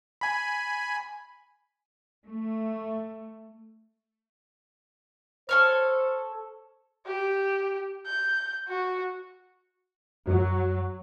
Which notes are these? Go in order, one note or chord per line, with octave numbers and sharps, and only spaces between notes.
G#5 B5
A3
A4 C5 C#5 F6
G4
G6
F#4
F#2 F#3